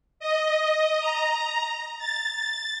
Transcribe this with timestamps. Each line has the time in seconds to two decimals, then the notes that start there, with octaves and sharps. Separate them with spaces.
0.20 D#5
1.00 A#5
1.99 A6